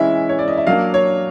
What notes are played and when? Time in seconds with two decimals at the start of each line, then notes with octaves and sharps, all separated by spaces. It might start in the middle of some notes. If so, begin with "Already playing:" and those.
Already playing: E3 G#3 C#4 E4 E5
0.29 C#5
0.39 D5
0.48 D#5
0.57 E5
0.67 F#3 A#3 D4 F5
0.94 C#5